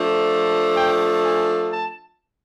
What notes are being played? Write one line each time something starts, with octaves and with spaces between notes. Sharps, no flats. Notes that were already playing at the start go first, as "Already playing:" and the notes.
Already playing: F3 A3 D4
G5
G#5
A5